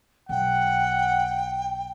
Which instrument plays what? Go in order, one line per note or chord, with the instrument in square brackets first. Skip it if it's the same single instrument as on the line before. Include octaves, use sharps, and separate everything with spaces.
[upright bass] B1 [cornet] F#5 [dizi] G5